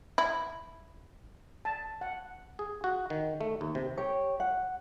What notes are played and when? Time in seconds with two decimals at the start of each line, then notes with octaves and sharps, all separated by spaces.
0.18 E4
1.65 A5
2.01 F#5
2.59 G#4
2.84 F#4
3.10 D#3
3.41 A3
3.61 D#2
3.75 C3
3.97 G4 C#5
4.40 F#5